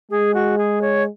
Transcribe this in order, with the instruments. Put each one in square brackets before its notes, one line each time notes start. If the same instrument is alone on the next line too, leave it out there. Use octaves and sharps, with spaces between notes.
[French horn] G#3 [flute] G#4
[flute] F#4
G#4
C#5